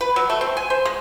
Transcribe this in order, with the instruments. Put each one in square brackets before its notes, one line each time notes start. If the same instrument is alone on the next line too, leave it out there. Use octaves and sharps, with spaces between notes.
[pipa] B4
F#3
A3
C4
G#5
C5
G#3